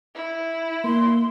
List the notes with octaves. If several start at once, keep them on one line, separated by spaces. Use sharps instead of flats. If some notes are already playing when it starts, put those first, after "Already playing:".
E4
A#3 C6